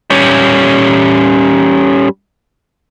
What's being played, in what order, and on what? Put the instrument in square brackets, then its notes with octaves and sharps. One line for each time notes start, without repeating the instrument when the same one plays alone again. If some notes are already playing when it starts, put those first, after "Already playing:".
[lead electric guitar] G3 C#4